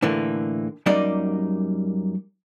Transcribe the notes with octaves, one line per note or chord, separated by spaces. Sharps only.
A2 D3 E3 A#3
F#2 G3 A#3 D#4 D5